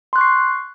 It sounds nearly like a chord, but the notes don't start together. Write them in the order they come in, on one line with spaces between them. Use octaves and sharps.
C6 F#6 C#6 C7